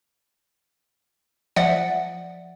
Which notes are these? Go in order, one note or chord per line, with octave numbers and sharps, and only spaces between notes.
F3 D5 E5 F#5